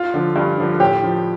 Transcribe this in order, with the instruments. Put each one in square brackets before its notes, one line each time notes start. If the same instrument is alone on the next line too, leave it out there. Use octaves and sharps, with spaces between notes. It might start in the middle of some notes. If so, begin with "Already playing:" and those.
Already playing: [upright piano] F4
D3 F3
G2
D3 F3
A2 G4
F3